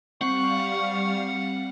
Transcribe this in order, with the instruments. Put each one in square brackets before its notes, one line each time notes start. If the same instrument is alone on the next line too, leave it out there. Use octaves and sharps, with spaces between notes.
[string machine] G3 F5 [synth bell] C4 [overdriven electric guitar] F#5 [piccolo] C#6